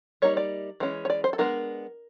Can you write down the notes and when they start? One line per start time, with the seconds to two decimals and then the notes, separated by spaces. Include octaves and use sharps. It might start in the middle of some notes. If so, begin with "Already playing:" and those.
0.22 G3 A#3 D#4 C#5
0.37 D5
0.80 E3 G#3 C#4
1.05 C#5
1.10 D5
1.24 C5
1.33 A4
1.38 G#3 B3 D4 A#4